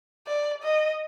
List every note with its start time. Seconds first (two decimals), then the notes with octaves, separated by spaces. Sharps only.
0.27 D5
0.63 D#5